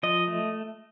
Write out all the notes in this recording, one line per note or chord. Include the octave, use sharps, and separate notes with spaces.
F3 D#5
A3